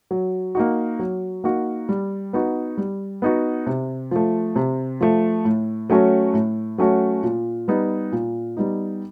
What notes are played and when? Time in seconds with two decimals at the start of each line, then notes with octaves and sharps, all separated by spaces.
0.11 F#3
0.55 A#3 D#4 F#4
0.99 F#3
1.44 A#3 D#4 F#4
1.89 G3
2.33 B3 D#4 F#4
2.78 G3
3.22 B3 D#4 F#4
3.67 C3
4.11 F3 A3
4.56 C3
5.01 F3 A3
5.45 A2
5.90 F#3 A3 C#4 F#4
6.34 A2
6.78 F#3 A3 C#4 F#4
7.23 A#2
7.68 G3 B3 D#4
8.12 A#2
8.57 G3 B3 D#4